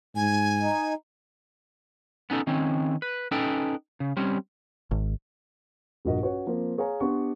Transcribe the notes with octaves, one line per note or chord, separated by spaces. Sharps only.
G#2 G#5
D#4
B3 C#4 D#4 A4
D#3 C4 C#4
B4
C#4 D#4 A4 B4 G5
C#3
G3 C4 C#4
G#1
A#1 G2 F#4 A#4 D#5
C#4 F#4 B4 C#5
F3 A#3 C4
G#4 C#5 F5 G#5 A#5
B3 D4 G4 F#5 C6 C#6